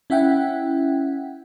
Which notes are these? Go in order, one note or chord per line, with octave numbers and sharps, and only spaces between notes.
C#4 E4 E5 F#5 G5